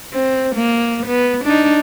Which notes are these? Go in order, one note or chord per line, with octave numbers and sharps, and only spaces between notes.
C4
A#3
B3
D4 D#4